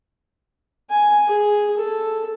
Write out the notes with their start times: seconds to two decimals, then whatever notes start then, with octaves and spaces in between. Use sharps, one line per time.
0.90 G#5
1.28 G#4
1.77 A4